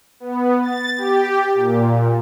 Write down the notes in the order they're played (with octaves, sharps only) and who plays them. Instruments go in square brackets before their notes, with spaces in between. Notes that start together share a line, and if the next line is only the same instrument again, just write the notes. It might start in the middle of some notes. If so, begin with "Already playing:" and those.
[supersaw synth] B3
A6
G4
A#2